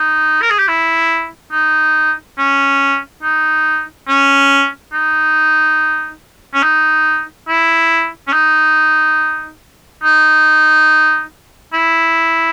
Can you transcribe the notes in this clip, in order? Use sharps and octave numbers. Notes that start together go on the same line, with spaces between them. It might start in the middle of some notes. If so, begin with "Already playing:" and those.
Already playing: D#4
A#4
G#4
G4
E4
D#4
C#4
D#4
C#4
D#4
C#4
D#4
E4
C#4
D#4
D#4
E4